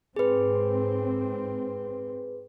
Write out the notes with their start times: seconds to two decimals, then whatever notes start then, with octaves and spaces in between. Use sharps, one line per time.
0.16 G#2 C4 G#4 B4